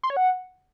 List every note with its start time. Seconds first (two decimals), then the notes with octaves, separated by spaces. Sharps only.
0.03 C6
0.10 C#5
0.17 F#5